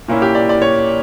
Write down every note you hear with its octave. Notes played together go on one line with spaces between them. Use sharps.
A#2 A#3 C#4 E4
G4
D5
D5
C#5